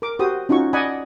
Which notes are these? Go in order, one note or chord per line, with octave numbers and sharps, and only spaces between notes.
A#4 D6
F#4 G4 C5 D#6
C#4 D#4 F4 F#4 C#6
D5 D#5 F#5 G#5 B5